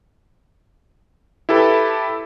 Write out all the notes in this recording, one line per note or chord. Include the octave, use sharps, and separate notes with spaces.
E4 G4 A4 B4 A5 B5